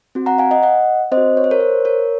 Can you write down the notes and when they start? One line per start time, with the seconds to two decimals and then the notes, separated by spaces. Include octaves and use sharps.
0.15 C4 F#4
0.26 F#5 A#5
0.38 F5 G#5
0.51 D#5 F#5
0.63 D#5 F#5
1.12 C4 C5 D#5
1.17 F#4
1.37 C#5
1.44 C5
1.51 A#4 C#5
1.60 C5
1.85 A#4 C#5